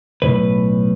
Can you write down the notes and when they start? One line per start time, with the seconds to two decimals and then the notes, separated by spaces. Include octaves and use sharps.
0.22 B1 A2 C3 B4